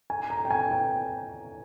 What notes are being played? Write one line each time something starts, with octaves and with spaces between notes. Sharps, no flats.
G#5
A#5
G5
G#5
G5